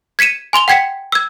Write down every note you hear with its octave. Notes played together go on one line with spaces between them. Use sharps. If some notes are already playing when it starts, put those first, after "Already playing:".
G#6 B6 C#7 D#7 E7
G#5 C6 F7 G7
F#5 G5 G#6 B6 C#7
E6 G#6